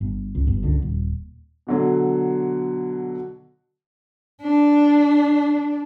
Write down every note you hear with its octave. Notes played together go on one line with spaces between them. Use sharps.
G1
C#2
G1 G2
C#2 D3
D#1
B2 D3 F#3
D4